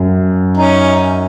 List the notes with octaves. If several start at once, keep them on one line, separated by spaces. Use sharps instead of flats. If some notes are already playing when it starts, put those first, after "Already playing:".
Already playing: F#2
C#4 D#4